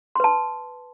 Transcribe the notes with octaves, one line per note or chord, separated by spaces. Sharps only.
B4 A5 C6